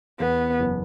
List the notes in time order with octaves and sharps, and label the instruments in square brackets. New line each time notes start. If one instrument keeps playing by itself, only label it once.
[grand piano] E2 [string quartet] B3
[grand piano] F#1